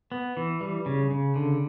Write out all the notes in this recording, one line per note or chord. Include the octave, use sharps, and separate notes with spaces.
B3
E3
G3
C#3
C#3
D3